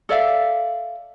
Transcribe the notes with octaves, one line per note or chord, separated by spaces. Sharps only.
A4 D5 E5 F5